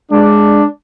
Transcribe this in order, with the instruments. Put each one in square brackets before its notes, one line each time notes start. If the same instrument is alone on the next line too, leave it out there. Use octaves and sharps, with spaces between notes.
[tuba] G#3 [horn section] D4